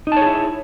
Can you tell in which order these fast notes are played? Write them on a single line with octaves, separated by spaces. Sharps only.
D#4 A5 C#5 G#4 E4